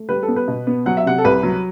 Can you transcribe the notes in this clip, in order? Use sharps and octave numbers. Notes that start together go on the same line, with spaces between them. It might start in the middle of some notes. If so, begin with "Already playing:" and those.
Already playing: A3
G3 B4
A4
B3
B4
B2
B3
F#3 F#5
E5
C3 F#5
A4
C2 B4
F#3